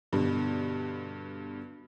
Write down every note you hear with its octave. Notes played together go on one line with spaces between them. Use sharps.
G2 B2 D3